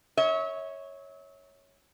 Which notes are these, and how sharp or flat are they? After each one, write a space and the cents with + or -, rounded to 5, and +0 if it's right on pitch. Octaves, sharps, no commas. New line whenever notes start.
C#5 +0 E5 -35